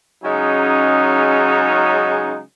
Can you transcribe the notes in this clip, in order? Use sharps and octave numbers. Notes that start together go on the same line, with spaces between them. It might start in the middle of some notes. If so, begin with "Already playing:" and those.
C#3 F#3 G#3 C#4 D#4